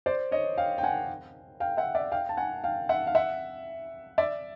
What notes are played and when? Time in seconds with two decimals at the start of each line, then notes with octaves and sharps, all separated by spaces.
0.06 C5 D5
0.32 C#5 D#5
0.57 F5 G5
0.78 G5
0.83 F#5 G#5
1.60 F5 G5
1.77 E5 F#5
1.95 D5 E5
2.12 F5 G5
2.29 A5
2.37 F#5 G#5
2.64 F5 G5
2.89 E5 F#5
3.07 F5
3.15 E5 F#5
4.18 D5 E5